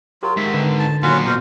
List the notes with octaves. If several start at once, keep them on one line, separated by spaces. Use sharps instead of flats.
F#3 F4 G4 A#4
G#2 D#3 E5
D3 B4
A5
A#2 D#3 F#3 B3 C#4 F4 F#4
B2 F#4 A#4 C5